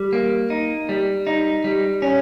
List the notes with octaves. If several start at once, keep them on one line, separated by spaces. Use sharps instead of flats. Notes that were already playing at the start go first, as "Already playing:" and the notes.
Already playing: G3
A#3
D#4
G3
D#4
G3
C#4